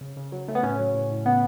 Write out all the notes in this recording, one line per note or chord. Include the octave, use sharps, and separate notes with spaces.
C#3
C#3
F#3
C#3 A3
B3
A2 C#4
F#3
A2
A2
C#3 B3